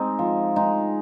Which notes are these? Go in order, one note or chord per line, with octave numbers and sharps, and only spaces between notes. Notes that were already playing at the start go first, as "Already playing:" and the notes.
Already playing: G#3 C4 D#4
F3
G#3 D#4